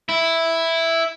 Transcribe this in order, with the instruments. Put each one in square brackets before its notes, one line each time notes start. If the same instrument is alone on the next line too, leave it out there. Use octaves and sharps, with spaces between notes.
[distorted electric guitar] E4